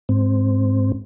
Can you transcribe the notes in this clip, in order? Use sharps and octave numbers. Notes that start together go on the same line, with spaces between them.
G#2 C4